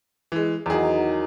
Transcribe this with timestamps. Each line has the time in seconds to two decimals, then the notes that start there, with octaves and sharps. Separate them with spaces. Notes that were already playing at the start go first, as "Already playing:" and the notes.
0.32 E3 G#3
0.66 E2 D#3 F#3 G#4